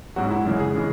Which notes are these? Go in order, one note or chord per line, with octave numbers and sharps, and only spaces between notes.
G#2 F#3 F#4
E4
F#2 C#3 E3 G#3
G#4
C#3 E3 G#3